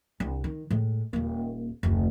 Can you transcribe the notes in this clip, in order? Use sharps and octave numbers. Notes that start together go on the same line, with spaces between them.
C2 D4
D#3
A2 G#3
D#1 A#3
F1 D2